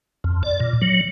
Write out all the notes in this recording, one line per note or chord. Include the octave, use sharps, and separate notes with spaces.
F2
D5
A#2
F#3